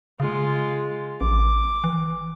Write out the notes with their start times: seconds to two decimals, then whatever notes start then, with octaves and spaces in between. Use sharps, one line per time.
0.20 C#3 G#3 F4
1.21 A1 D6
1.84 E3